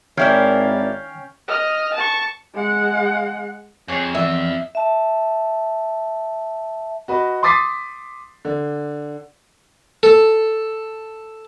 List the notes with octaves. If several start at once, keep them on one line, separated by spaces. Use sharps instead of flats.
G#1 D#3 C#4 D4 E4 A#4 F5 G5
D#5 F6
A5 C#6
G#3 F#5
F2 G#4 C#5 G#5
E2 E5
E5 A5
F#4 B4 D#5
C6 D6 D#6 A6 B6 C7
D3
A4